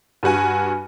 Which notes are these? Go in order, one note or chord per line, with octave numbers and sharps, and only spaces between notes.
G2 G3 F#4 G#5